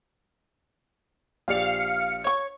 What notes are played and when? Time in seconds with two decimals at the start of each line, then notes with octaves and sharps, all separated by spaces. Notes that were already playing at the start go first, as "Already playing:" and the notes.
1.48 A#1 G4 D5 F5 C#7
2.24 C#5 C#6